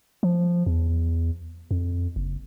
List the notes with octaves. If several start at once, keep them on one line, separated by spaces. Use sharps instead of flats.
F3
E2
F2
F#1